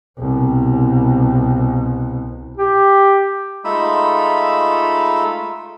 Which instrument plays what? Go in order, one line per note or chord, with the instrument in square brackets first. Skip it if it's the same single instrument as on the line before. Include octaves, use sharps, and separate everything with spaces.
[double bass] C2 B2
[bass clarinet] G4
[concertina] G#3 A3 D#4 F4 B5 E6